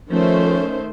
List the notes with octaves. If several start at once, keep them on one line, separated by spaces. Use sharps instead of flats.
D#3 F3 A3 C#4 C5